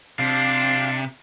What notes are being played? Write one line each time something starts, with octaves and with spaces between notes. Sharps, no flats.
C3 D4 F5 A5